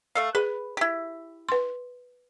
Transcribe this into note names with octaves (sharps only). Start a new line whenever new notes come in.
A3 A4 F5
G#4 B4
E4 G4
B4 C6